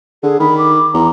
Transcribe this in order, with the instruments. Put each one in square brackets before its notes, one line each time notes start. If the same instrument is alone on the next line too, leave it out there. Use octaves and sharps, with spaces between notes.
[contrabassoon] D3 [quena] G#4
[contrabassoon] D#3 [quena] B5
[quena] D6
[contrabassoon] E2 [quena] A#5